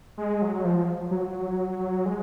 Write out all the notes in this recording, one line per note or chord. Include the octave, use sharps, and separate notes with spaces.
G#3
F#3
F3
F#3
G#3